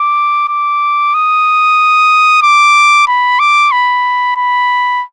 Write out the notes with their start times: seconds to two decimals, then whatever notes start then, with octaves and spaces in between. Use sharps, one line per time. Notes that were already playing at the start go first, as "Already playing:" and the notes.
Already playing: D6
0.49 D6
1.14 D#6
2.43 D6
3.08 B5
3.40 D6
3.72 B5
4.37 B5